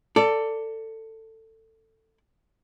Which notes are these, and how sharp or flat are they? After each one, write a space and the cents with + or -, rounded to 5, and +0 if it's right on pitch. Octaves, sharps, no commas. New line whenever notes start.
A4 +20 D5 -10